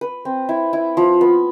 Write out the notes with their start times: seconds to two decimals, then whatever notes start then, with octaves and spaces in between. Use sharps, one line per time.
0.01 B4
0.25 C4
0.49 E4
0.73 E4
0.97 F3
1.21 B3